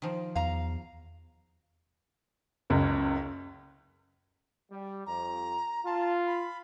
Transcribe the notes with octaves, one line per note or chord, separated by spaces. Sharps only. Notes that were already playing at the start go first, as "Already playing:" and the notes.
D#3 F3
E2 F5 A#5
F#1 C#2 F#2
G3
F2 A#5
F4 A5
B5